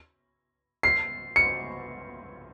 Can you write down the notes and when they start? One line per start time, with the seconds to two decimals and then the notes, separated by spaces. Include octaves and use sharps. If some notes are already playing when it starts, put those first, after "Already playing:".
0.83 C7
1.36 C#7